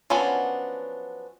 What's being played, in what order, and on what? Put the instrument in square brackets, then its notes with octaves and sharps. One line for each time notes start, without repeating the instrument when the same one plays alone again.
[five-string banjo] F3 F#3 B3 C#4 D4